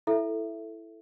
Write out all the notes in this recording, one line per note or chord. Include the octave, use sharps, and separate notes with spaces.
E4 A4 E5